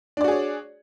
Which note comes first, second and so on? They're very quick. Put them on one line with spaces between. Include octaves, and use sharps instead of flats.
D4 D5 F#4 G#4 C#5